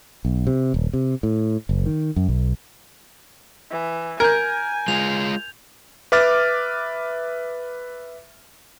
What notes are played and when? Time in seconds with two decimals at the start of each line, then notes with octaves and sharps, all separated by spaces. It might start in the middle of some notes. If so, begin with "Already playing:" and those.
0.25 B1
0.47 C3
0.74 D#1
0.94 C3
1.23 A2
1.69 F#1
1.86 D#3
2.16 F#2
2.29 B1
3.71 E3
4.20 A#4 G#5 G6 G#6
4.88 G#3 F4 F7
6.12 B4 E5 D6 F6 A6